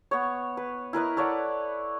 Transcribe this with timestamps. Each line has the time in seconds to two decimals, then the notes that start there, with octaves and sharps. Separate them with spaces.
0.11 B3 C#5
0.57 B4
0.93 E4 A#4 B4 D#5
1.17 A4 C#5 D5 F#5